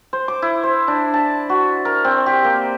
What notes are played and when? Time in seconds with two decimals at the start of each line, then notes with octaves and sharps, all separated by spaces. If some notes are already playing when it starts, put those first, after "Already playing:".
0.13 C5
0.28 D6
0.42 E4
0.63 C5
0.88 D4
1.14 A5
1.49 F#4
1.85 A#4
2.04 C4
2.26 G4
2.44 A#3